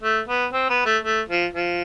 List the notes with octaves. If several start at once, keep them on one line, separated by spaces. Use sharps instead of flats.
A3
B3
C4
B3
A3
A3
F3
F3